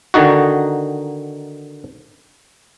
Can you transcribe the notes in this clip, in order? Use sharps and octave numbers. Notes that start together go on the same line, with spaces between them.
D3 D#3 D#4 F#4